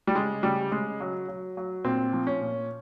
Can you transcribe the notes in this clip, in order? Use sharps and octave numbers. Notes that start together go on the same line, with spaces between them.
G3
C#3 G#3
C#3 G3
C#3 G#3
F#3
F#3
F#3
A#2 C4
F3
C#4
A#2